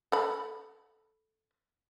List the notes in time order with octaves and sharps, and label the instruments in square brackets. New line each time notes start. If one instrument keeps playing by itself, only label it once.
[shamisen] A4 B5